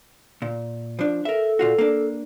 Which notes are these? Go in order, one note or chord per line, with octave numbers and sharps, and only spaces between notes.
A#2
F3 D4
A4 A#4 E5
A#2 F4 F#4
A#3 D4